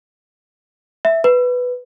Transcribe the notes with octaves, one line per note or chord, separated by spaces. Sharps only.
E5
B4